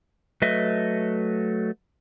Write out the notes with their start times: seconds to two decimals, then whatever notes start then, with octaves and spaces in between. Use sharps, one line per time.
0.42 F#3 A3 B4 D#5 E5